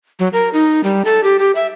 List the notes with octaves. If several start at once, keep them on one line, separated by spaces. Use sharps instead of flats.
F#3
A#4
D#4
G3
A4
G4
G4
E5